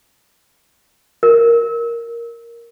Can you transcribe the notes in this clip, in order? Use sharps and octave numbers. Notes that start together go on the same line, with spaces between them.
A#4